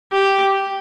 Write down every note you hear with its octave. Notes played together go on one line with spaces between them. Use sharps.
G4